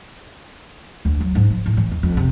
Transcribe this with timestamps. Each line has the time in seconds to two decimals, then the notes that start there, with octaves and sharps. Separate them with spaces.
1.05 D2
1.20 F#3
1.35 G#2
1.50 F3
1.66 A2
1.77 E3
1.92 E2
2.03 F2
2.17 C3